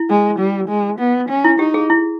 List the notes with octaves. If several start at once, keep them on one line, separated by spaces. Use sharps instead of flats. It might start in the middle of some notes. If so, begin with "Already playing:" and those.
Already playing: E4
G#3
G3
G#3
B3
C#4
E4
D#4 G4
G#4
E4